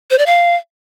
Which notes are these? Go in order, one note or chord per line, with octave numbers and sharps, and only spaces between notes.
C5
D5
F5